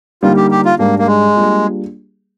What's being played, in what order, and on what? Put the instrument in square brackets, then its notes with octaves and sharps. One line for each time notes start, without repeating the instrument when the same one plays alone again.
[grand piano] D3 G3 A#3 D#4 [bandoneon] F4
[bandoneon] G4
G4
F4
[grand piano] G#2 G3 D4 [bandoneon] A#3
[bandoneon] A#3
G#3
[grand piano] G3 A#3 D4 F4 G#4